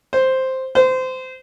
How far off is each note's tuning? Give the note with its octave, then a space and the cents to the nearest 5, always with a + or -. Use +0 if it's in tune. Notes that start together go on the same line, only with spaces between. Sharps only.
C5 +0
C5 -25